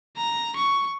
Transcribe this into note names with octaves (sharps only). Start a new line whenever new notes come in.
A#5
C#6